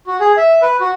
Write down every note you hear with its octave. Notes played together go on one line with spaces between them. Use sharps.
F#4
G#4
E5
B4
F#4